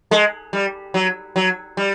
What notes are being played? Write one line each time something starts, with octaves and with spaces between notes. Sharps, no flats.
G#3
G3
F#3
F#3
G3